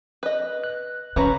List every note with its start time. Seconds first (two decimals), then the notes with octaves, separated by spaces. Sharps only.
0.23 B4 D#5
0.64 F#6
1.16 C#3 F3 C#4 F4 B4 A#5 B5